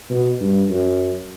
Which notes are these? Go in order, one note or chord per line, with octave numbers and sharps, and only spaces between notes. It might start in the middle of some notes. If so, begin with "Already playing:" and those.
B2
G2
F#2